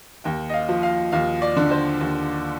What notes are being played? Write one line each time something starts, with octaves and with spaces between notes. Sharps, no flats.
D#2 G5
D#5
F5
F3
F5
D#2 F5
D5
D3
C5
D#2